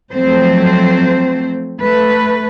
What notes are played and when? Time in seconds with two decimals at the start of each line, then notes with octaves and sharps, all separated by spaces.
0.11 F3 F#3 A3 C4 C5
1.81 A3 B4